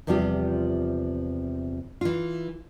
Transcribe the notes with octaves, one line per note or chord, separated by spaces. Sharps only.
E2 C3 F3 G3 F4 G4
E3 F4